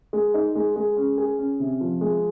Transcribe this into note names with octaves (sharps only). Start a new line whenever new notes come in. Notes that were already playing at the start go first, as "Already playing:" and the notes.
G#3
D#4
G#3
G#3
C#4
G#4
C#4
C3
F3
G#3